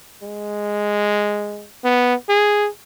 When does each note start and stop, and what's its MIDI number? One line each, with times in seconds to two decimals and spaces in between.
0.23 1.65 56
1.85 2.14 59
2.29 2.68 68